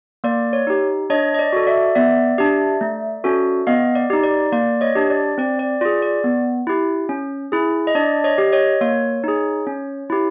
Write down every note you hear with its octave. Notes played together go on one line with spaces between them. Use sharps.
A#3 D5
C#5
D#4 G4
D4 C#5 D#5
D#5
D5
F#4 A4
D5 E5
B3 D5 E5
D4 G4
A3
C#4 F#4 A4
B3 D#5 F5
D5
D#4 G4
D5
A#3 D5
C#5 D#5
D4 G4
D5
C4 D5
D5
F4 G#4 D5
D5
B3
E4 G4
C#4
E4 G#4
D#5
D4 D5
C#5 D#5
G4
C#5 D#5
A#3 C#5
D#4 G#4
C#4
E4 G4